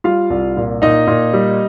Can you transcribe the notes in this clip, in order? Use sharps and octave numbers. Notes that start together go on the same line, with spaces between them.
G3 F4 F5
C2
A#2
A#2 D#4 D#5
A#2
G3